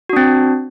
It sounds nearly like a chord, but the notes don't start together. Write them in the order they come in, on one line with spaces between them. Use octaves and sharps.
F#4 D4 C4